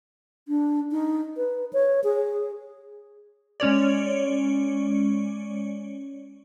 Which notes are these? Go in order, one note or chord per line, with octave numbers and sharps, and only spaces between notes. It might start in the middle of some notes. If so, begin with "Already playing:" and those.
D4
D#4
B4
C#5
G#4
G#3 C#4 C#5 D5